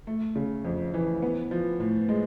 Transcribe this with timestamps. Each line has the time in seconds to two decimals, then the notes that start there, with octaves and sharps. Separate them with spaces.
0.07 A3
0.36 C#3
0.65 F2
0.94 E3
1.22 B3
1.51 F3
1.80 A2
2.09 G#3